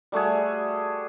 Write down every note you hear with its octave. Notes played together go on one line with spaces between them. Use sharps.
G3 A3 F#4 G#4